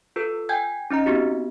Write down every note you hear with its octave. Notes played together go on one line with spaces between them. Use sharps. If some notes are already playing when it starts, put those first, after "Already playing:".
F4 A4 B4 E6
G5 G#5 G6 G#6
C#4 D#4 D#5 A#5
B3 C4 D#4 F#4 G4